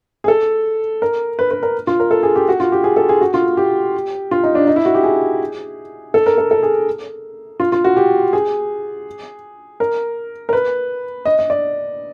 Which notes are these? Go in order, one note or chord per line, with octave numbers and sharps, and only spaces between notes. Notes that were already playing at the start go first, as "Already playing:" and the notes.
G#4
A4
A#4
B4
B4
A#4
F4
A#4
A4
G#4
G4
F#4
F4
G4
G#4
A4
G#4
F#4
F4
G4
F4
D#4
D4
D#4
E4
F#4
G4
G#4
A4
A#4
A4
A4
G#4
F4
F4
F#4
G4
G#4
A#4
A#4
B4
D#5
D#5
D5